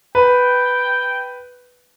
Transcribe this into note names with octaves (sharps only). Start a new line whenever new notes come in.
B4 G5